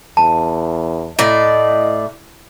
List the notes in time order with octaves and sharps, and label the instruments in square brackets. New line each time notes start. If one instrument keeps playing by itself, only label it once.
[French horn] E2 [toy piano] A5
[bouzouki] A2 D5 [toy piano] E4 [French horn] D#5